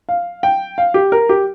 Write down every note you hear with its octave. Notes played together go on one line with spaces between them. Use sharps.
F5
G5
F5
G4
A#4
G4